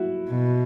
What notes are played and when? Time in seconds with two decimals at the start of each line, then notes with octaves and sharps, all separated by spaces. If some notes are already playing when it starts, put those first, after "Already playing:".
Already playing: E4 F#4
0.30 B2